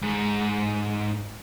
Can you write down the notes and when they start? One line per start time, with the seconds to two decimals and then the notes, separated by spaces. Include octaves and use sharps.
0.02 G#2